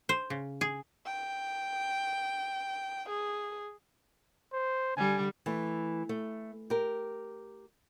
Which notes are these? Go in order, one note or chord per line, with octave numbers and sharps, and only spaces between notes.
C5
C#3
G#4
G5
G#4
C5
D3 G3 G#5
E3 A3
A3
G4 A#4